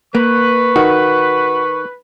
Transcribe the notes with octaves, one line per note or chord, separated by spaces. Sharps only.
A#3 B4 C#6
D#3 F#4